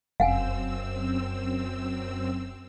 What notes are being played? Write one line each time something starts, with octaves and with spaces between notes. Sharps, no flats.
F1 F#2 C4 F5 F#5 G#5 E6